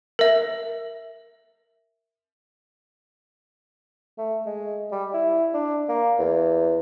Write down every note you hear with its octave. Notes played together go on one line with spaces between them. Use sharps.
A#4 E5
A3
G#3
G3
E4
D4
A#3
E2